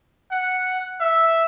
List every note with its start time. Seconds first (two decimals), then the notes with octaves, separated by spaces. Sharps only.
0.31 F#5
1.00 E5